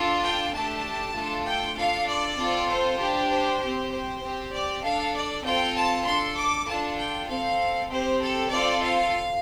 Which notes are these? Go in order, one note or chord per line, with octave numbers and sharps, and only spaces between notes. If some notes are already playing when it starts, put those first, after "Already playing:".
Already playing: D4 F4 A4
G5
A3 D4 G4 A5
A3 D4 F4 A4
G5
D4 F4 A4 F5
D5
C4 F4 A4
C5
D4 G4
C5
C4 G4
C5
C4 G4
D5
D4 A4 F5
D5
C4 F4 A4 G5
A5
D4 A4 C6
D6
D4 F4 A4 A5
G5
C4 A4 F5
C4 G4 C5
A4
C4 F4 A4 D5
F5